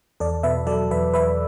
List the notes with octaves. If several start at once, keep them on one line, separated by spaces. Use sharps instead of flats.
E2 A4 D5
B2 B4 E5
F#3 A4 D5
E2 B4 E5
E2 B4 E5